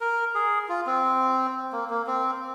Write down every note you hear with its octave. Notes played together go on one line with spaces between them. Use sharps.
A#4
G#4
F4
C4
A#3
A#3
C4